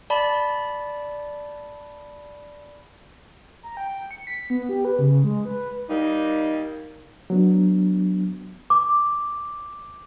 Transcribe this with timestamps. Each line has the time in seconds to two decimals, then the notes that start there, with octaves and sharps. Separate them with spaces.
0.10 D5 A5 B5
3.63 A#5
3.77 G5
4.11 C#7
4.27 B6
4.50 B3
4.69 G4
4.85 B4
4.99 C#3
5.24 G#3
5.45 B4
5.89 G3 A#3 D#4
7.30 F#3 B3 D4
8.70 D6